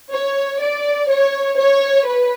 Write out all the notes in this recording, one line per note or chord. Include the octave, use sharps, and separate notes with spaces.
C#5
D5
C#5
C#5
B4